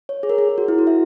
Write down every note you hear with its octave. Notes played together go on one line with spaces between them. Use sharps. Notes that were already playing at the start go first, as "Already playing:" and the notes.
C#5
G#4
A#4
G#4
G#4
F#4
E4
F#4
E5